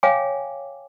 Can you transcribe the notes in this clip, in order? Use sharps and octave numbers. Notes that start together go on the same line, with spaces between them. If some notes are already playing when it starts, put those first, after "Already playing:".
C#5 F5 G5 G#5 D6